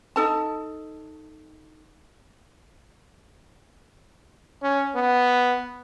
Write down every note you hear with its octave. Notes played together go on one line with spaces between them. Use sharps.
D#4 A4 A5
C#4
B3